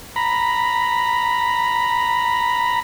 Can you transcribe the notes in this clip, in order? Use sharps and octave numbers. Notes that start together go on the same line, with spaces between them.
A#5 B5